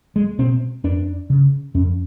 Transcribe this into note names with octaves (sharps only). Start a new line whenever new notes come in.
G#3
B2 C4
F2 D4
C#3
F2 C#4